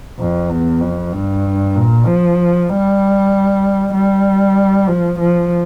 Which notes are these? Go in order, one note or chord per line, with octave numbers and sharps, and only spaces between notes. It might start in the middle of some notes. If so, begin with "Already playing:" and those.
F2
E2
F2
G2
A#2
F3
G3
G3
F3
F3